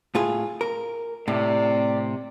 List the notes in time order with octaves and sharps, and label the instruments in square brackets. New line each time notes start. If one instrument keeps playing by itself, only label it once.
[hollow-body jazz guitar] A2 F4 G#4
A#4
[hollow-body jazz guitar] A2 [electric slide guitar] C3 [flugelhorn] D5